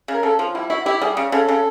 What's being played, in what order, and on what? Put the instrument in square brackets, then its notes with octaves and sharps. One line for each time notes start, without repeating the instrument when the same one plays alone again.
[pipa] C#3
[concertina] A#4
[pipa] C#3 [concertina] A4
[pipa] F3
[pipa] G3 [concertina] E4
[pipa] E4 [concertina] F#4
[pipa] E4 [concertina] G4
[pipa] G3 [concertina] G#4
[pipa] C#3
[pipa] C#3 [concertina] A4
[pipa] C#3